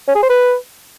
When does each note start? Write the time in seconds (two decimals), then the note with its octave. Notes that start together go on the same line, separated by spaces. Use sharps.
0.08 C#4
0.16 G#4
0.23 C5
0.30 B4